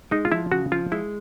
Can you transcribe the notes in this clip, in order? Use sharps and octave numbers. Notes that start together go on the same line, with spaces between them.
G#3 D#4
F4
F3 E4
C#3 F#4
F3 F4
G#3 E4